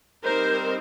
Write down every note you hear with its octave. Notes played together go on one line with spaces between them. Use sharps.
G3 C4 D#4 A#4 C5